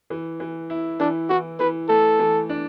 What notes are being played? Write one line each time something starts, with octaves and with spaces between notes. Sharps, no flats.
E3
E3
E4
E3 D4
E3 F#4
E3 B4
A3 A4
E3
D4